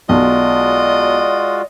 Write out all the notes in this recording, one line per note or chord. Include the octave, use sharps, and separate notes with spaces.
B1 G#3 F4 F#4 D5 D#5